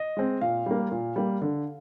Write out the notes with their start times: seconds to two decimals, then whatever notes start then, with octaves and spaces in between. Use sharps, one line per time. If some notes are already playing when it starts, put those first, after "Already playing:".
Already playing: D#5
0.17 G#3 C4
0.41 A#2 F5
0.66 G3 A#3
0.92 A#2
1.16 G3 A#3
1.42 D3